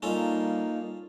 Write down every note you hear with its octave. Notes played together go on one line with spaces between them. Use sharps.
G3 A#3 C#4 D#4 F4 A4